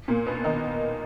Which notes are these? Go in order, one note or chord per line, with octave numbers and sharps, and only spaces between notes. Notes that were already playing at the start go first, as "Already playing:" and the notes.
A#2 A#3
B2 B3
D#3 D#4